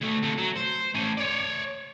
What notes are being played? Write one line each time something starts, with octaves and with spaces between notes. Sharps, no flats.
D2 A3
C3 A3
F#3
C5
A3 C#4
C#5 D5